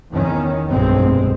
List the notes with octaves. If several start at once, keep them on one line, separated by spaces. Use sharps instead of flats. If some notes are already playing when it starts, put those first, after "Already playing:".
E2 D#3 C#4
F1 B1 G2 B2 G#3 C4